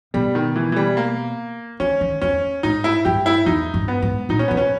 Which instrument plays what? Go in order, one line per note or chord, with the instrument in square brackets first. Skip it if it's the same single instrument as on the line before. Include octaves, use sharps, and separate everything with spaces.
[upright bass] B2 [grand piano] G3
[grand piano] D#3
E3
E3
G3
A#3
[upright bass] D#3 [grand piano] C#4
[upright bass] D#3
[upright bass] E2 [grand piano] C#4
[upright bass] G#2 [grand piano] D#4
[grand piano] E4
[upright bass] G2 [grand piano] G4
[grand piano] E4
[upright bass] E2 [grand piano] D#4
[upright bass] G2
[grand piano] B3
[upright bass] G#2
[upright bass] A#2 [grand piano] D#4
[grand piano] C#4
[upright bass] B2 [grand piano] B3
[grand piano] C#4